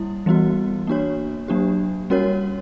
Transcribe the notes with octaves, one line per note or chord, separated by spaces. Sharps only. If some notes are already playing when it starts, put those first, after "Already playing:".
Already playing: G3 A#3 E4
E3 G3 B3 F#4
A#3 D4 F#4 C#5
F#3 A#3 D4 G4
G3 C#4 F#4 A#4 C#5